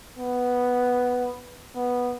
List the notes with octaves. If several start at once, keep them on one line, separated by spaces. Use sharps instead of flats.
B3
B3